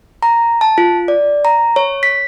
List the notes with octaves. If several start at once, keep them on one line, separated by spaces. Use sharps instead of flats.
A#5
A5
F4
D5
A#5
C#5
B6